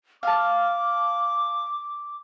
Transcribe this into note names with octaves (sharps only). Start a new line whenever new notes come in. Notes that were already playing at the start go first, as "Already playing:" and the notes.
F5 A5 D6